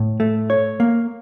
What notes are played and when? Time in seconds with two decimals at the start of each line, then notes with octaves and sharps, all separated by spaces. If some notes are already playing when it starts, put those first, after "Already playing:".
Already playing: A2
0.20 A3
0.50 C#5
0.80 A#3